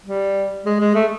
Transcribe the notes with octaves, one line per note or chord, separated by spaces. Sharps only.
G3
G#3
G#3
A3